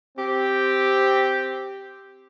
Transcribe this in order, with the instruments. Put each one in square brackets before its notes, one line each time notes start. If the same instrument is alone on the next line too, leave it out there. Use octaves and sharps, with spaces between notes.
[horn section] C4 G4